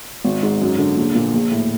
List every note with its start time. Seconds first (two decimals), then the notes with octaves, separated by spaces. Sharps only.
0.24 G#1
0.43 G#2
0.62 F#2
0.79 D3
0.97 A#1
1.15 A#2
1.34 A#1
1.51 A2